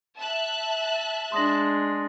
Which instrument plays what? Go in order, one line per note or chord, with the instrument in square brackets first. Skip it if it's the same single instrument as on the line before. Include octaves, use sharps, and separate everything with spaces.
[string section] E5 A5 F#6
[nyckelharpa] G#3 D4 [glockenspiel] C6 D#6 A#6